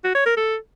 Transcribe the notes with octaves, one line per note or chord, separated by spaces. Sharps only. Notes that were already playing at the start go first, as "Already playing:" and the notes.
F#4
C#5
A#4
A4